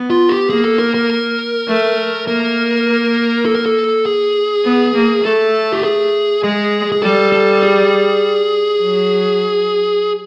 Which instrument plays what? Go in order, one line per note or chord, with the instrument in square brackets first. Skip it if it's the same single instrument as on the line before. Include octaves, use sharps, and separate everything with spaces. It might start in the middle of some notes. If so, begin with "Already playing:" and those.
Already playing: [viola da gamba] B3
[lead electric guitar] F4
G4
[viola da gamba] A#3 [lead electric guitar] G#4
[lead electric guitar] A4
A#4
A#4
[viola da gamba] A3
[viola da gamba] A#3 [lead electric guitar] A#4
[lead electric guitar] A4
A#4
A4
G#4
[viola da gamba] B3
A#3
[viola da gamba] A3 [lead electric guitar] A4
[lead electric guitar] G4
G#4
[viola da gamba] G#3 [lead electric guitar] G#4
[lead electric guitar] G#4
[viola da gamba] G3 [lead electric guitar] A4
[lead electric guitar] A4
G#4
[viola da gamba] F#3